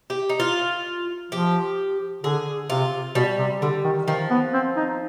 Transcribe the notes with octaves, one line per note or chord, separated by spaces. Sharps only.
G4
D#4
F4
F3 G4
D3 G#4
C3 F4
B2 G3
C3
D3 G3
D#3
D#3 F3
B3
C4
D#4